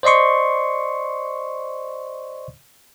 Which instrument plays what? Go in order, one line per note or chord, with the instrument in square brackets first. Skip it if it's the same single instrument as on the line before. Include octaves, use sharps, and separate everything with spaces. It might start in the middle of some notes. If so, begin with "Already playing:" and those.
[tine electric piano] C5 D5 D#5 C6 C#6